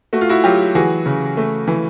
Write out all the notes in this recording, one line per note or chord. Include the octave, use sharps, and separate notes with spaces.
A3 F#4
F4
E4 F#4
F#3 F4 G4
E3 F#4 G#4
C#3
A3
E3